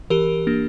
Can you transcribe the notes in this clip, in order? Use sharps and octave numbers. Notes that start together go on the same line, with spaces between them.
E3 G4 A#4
A#3 D4